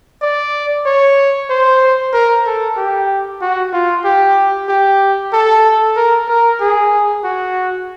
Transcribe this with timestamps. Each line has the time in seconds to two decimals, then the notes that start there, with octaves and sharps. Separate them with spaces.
0.22 D5
0.86 C#5
1.50 C5
2.14 A#4
2.45 A4
2.77 G4
3.42 F#4
3.73 F4
4.05 G4
4.69 G4
5.33 A4
5.96 A#4
6.28 A#4
6.60 G#4
7.24 F#4